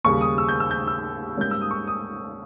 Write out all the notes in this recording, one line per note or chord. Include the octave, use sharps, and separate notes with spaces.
D#2 C#3 G3 C#6
D#6
E6
G6
E6
G6
E6
G#2 G3 A#3 C#4 G6
E6
D#6
C#6
D#6